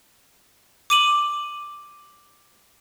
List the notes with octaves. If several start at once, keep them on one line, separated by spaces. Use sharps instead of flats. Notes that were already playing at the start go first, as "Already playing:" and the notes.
D6 D#7 F#7